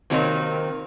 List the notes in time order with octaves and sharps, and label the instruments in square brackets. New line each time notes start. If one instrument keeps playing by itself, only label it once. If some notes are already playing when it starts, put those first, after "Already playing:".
[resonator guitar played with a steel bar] C3 D#3 F#3 A#3 C4